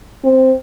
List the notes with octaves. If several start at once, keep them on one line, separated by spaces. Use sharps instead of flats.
C4